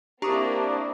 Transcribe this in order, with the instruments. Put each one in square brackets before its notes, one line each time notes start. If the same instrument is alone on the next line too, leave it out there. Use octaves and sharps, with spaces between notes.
[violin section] A#3 C4 E4 [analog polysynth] D4 [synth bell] G4 [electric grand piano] A#5 C#6 D#6